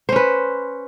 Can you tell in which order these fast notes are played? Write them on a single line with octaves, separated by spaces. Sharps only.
C5 C#4 B4